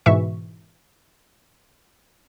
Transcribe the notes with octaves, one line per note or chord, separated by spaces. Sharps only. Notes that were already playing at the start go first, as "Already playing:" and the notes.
G#2 B2 E3 E5 C#6